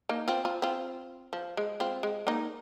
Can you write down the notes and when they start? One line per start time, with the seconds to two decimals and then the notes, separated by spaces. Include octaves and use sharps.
0.09 A#3 D#4
0.28 C4 F4
0.45 C4 F4
0.62 C4 F4
1.33 F3
1.57 G#3
1.80 C4 F4
2.03 G#3
2.27 A#3 D#4